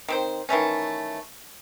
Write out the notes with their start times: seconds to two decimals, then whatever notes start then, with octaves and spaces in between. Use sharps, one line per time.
0.08 D#3 C4 C5
0.49 D#3 E3 A3 C#4